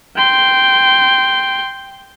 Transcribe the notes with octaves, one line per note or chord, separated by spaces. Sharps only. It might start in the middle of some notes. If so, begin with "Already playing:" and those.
G5 C6